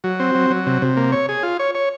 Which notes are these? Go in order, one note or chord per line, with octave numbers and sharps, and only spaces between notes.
F#3
C4
F#3
F#3
C3
C3
A#3
C#5
G#4
F4
C#5
C#5